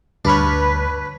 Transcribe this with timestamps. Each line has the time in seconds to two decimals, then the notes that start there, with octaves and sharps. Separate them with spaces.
0.25 D2 G2 D4 B4 C#5 B5 F6